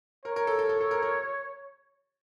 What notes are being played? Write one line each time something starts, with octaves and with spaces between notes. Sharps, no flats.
A#4 C#5
A#4
A4
A4
A4
A4
A#4
A#4